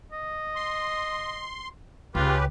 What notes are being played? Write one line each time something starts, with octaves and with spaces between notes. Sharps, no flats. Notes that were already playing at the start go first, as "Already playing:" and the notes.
D#5
C6
C#2 C#3 F4 G4 B4